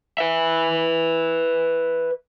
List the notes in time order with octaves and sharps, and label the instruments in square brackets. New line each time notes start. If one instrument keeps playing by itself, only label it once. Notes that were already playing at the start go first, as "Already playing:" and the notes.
[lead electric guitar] B4 E5